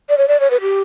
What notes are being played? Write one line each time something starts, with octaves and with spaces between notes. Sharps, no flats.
D5
C#5
D5
C#5
B4
G4